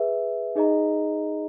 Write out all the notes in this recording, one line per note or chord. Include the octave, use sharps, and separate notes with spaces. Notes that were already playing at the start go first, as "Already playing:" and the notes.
Already playing: G#4 B4 E5
D#4 G#4 D#5 A#5